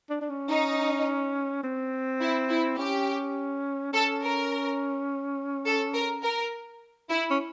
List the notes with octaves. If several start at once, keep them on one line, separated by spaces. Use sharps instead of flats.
D4
D4
C#4
D#4
C4
E4
E4
C#4 G4
C#4 A4
A#4
A4
A#4
A#4
E4
C#4